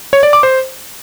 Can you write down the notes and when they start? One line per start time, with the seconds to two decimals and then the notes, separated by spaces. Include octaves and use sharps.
0.13 C#5
0.23 D5
0.33 D6
0.43 C5